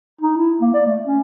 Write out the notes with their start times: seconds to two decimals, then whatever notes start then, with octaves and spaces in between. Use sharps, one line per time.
0.21 D#4
0.37 E4
0.61 A#3
0.74 D5
0.86 A3
1.06 C#4